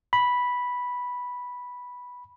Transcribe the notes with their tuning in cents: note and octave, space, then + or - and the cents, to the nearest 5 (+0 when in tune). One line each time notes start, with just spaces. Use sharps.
B5 -5